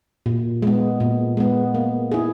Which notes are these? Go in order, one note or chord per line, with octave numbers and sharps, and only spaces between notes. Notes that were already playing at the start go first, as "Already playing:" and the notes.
A#2
G#3 B3
A#2
G#3 B3
A#3
E4 G#4